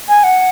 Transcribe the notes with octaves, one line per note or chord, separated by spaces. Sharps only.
G#5
F#5